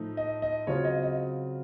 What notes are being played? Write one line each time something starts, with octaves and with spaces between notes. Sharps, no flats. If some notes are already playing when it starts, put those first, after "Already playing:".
Already playing: A2 F3 A3 D#4
D#5
D#5
C#3 F#3 C4 F4 C#5
D#5
D#5